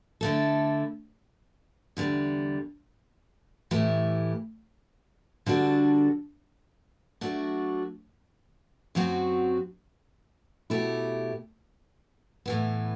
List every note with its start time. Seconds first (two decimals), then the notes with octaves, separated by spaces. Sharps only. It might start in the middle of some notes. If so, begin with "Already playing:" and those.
0.21 D3 A3 E4 A4
1.97 E2 D3 G3
3.71 A2 E3 A3 E4 G4
5.46 D3 G3 D4 F#4 A4
7.21 F#3 A3 D4 F#4
8.95 F#2 F#3 C4 F#4
10.70 B2 A3 E4 G4
12.46 A2 E3 B3